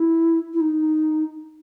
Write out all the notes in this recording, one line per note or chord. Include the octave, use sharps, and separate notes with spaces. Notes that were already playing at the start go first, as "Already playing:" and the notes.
Already playing: E4
E4
D#4